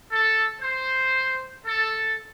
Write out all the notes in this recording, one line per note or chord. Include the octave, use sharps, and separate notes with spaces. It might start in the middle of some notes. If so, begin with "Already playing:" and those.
A4
C5
A4